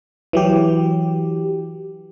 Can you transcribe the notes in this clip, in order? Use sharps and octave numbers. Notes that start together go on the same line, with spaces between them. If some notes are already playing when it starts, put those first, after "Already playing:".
E3 F#3 G4